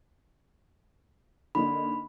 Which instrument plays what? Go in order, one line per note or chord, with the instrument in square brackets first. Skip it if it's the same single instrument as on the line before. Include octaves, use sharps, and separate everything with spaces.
[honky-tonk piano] D3 A#3 D#4 [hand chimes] B5